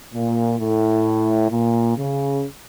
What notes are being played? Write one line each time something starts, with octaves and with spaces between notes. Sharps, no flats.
A#2
A2
A#2
C#3